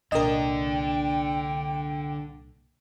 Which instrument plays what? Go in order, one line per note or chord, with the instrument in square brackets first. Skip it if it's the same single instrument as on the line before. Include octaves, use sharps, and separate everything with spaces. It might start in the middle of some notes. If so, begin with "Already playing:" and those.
[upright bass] C2 A#2 [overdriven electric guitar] D3 D4 [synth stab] A#4 D#5 [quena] G5